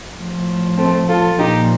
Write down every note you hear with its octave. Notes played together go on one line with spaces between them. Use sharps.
A2 F3
A3 C4
F4 A4
A#2 F3 D#4 G4